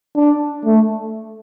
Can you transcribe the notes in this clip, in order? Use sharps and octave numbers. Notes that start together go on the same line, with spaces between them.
D4
A3